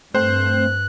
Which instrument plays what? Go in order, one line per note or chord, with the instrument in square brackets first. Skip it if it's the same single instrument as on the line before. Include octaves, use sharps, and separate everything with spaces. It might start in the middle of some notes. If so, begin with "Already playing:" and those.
[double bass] G2 [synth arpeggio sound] A3 C4 [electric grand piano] C5 [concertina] F#6